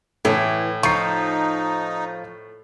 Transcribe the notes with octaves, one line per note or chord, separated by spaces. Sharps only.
A2 E3
F3 D#4 C#6 C7